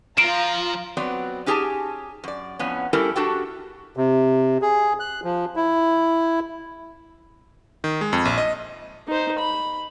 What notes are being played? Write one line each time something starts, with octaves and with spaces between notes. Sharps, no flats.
F3 F4 A#5 C7 D7 E7
F#3 B3 C4 D5
C#4 D#4 G4 G#4 G#5 A5
F#2 D5
F2 A2 B3 C#4
G3 C#4 E4 G4 A4 A#4
D4 F#4 G4 A4 G5
C3
G#4
F#6
F3
E4
D#3
G#3
F2
A#1
D#5
D#4 C5
B5